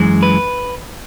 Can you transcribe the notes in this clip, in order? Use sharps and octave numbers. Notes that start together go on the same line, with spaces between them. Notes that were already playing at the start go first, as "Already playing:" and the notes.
Already playing: F#2 E3 G#3
B4